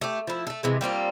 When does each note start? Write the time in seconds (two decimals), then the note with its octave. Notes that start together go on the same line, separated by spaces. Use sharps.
0.01 A3 G4
0.27 F3 E4
0.47 A3 A4
0.63 C3 E3 G#3
0.81 G3 A#3 C4 F4